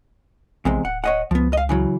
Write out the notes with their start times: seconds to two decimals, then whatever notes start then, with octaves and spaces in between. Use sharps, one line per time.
0.65 A#1 E2 C3 G#3
0.85 D1 F#5
1.04 C#5 D#5 F#5
1.31 C#2 F3 B3
1.53 D#5 F5
1.69 C#3 E3 F#3